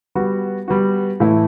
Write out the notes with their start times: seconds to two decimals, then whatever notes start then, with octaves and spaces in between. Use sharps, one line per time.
0.15 G3 B3 F#4
0.68 G3 B3 F#4
1.20 A2 E3 A3 E4